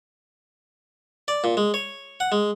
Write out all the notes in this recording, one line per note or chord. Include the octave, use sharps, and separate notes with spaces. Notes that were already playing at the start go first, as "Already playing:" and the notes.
D5
A#2
G#3
C#5
F#5
G#3